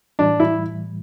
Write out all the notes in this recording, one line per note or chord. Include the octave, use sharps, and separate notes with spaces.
A2 E3 G3 D4
E4